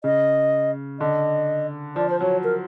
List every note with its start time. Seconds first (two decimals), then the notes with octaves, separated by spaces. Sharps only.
0.04 C#3 D#5
1.00 D3 D#5
1.96 F3 D5
2.10 C5
2.21 F#3 C#5
2.44 A#4